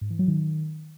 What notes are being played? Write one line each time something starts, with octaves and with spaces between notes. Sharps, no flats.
G#2
E3
F#3
D#3